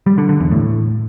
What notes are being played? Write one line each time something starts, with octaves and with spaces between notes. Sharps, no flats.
G3
D3
D3
E2
A2